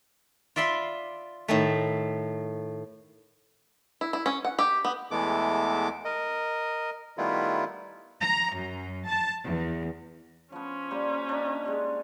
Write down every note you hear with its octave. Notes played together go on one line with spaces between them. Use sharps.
F4 D5 E5 B5 C6
A2 D#3 A3
E4
E4
C#4
F#5
G4
B3
E2 E3 G#3 A3 B3 D6
A#4 D#5
D#3 G3 A3 B3 E4 F4
A#5
F#2
A5
E2
F3 B3 C#4
G3 A#3 C5
D4 D#4
G#3 G4